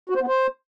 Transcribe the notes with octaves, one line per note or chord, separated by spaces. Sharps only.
F#4
C5
B3
C5